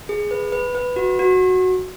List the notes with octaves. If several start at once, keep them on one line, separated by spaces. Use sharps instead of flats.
G#4
B4
B4
B4
F#4
F#4